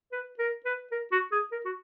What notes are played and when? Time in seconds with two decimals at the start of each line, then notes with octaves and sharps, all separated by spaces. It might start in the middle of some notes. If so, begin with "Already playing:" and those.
0.12 B4
0.39 A#4
0.65 B4
0.91 A#4
1.12 F#4
1.32 G#4
1.52 A#4
1.65 F#4